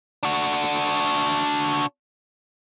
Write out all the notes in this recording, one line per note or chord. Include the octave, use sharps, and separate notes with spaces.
D4 F#4